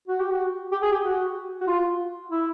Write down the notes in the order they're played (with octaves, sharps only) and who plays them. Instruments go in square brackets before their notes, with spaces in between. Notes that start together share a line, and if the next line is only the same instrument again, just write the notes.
[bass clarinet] F#4
G4
F#4
G4
G#4
G4
F#4
F#4
F4
E4